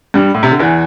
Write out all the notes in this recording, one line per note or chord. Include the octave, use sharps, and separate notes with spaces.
G2 G3
A2
C3
D3
E2 E3